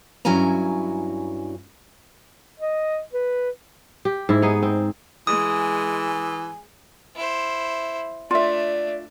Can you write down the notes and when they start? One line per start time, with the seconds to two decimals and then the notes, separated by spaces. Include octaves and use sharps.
0.25 G2 F#3 C#4 E4 G#5 A#5
2.60 D#5
3.13 B4
4.05 G4
4.29 G#2 E4
4.42 B3 D#4 G#4
4.63 C4
5.27 E3 G#3 G#5 D#6
7.16 E4 C5
8.31 A3 D4 F4 D5 E5